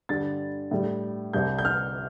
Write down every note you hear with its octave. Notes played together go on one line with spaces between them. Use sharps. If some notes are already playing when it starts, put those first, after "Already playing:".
G2 D3 G3 A6
A2 G3
C2 C3 G3 G6
G6
F6